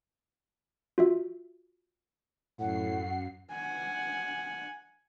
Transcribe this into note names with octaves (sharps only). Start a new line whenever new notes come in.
F4 F#4 E5
F#2 A2 F#5 C7
F#5 G#5